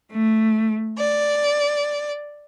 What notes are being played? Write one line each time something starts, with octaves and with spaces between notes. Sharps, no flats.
A3
D5